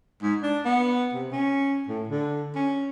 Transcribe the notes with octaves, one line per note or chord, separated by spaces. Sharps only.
G#2
D4
B3
C3
C#4
A2
D3
C#4